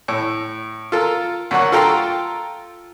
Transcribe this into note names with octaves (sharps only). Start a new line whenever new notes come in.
A2
F4 A4 A#4
D2 F#3 A#3 F#4 F#5
F4 A4 G5 A#5 C6